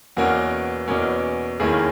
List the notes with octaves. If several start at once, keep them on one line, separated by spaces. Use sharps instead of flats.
E2 B2 A#3 C#4 F#4
E2 B2 A#3 C#4
E1 D#2 D#3 A#3 C#4 E4 G#4